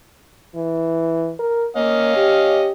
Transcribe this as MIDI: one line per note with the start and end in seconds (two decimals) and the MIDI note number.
0.55 1.32 52
1.39 1.66 70
1.76 2.14 58
1.76 2.69 61
1.76 2.69 75
1.76 2.69 77
2.16 2.72 67